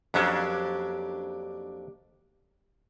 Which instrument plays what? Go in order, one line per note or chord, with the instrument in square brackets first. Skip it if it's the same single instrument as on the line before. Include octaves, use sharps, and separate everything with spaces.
[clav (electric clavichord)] F2 F#3 C#4 [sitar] A#3 D4 G4